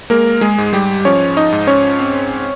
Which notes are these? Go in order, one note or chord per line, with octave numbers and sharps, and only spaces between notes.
G#3 A#3 A#4
G#3 G#4
G#2
G3 G4
F3 C#4 C#5
D#4 D#5
G#2
C#4 C#5
C4